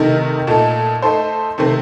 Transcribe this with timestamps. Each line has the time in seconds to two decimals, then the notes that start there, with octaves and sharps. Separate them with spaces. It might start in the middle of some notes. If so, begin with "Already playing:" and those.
Already playing: C3 D#3 A3 D#4 A#4
0.47 A#2 A3 D#4 A4
1.02 A3 D#4 A4 C5
1.58 C3 D#3 A3 C4